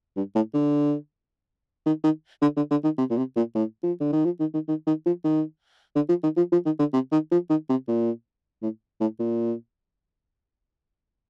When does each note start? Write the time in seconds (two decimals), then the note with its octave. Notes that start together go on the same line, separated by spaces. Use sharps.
0.16 G2
0.35 A2
0.54 D3
1.86 D#3
2.04 D#3
2.42 D3
2.56 D3
2.71 D3
2.84 D#3
2.98 C3
3.10 A#2
3.17 C3
3.36 A#2
3.55 A2
3.83 F3
4.00 D3
4.12 D#3
4.25 F3
4.40 D#3
4.54 D#3
4.68 D#3
4.87 D#3
5.06 F3
5.24 D#3
5.95 D3
6.09 F3
6.23 D#3
6.37 F3
6.52 F3
6.65 D#3
6.79 D3
6.93 C3
7.12 D#3
7.31 F3
7.49 D#3
7.69 C3
7.88 A#2
8.62 A2
9.01 A2
9.19 A#2